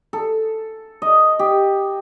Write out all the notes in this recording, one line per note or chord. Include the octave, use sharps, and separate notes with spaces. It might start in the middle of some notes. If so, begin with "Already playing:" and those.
A4
D#5
G4